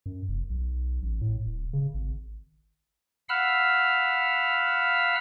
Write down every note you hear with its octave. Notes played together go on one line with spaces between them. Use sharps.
F#2
F1
B1
A1
A2
D1
C#3
G#1
F5 F#5 B5 E6 F6